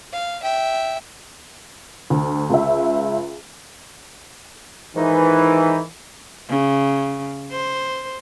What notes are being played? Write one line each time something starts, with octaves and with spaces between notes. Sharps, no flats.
F5
E5 G5
D2
C#2 E5
G#2 D#3 E3 D#4
C#3
C5